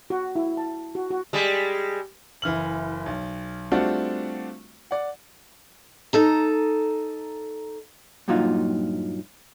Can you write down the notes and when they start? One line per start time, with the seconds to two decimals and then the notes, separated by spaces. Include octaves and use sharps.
0.10 F#4
0.35 E4
0.57 A5
0.95 F#4
1.11 F#4
1.33 G3 G#3
2.42 F#1 E3 F6 F#7
3.06 B1
3.71 G3 A3 C4 D4 F4 F#4
4.91 D5 F#5
6.13 D#4 A4 A#5
8.28 G2 A#2 F#3 D#4 F4